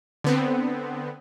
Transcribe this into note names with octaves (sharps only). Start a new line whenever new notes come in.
D3 B3 C4